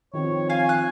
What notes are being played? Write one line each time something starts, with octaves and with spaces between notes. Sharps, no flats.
D#3 F3 C4 C#5
F5 G#5
F#6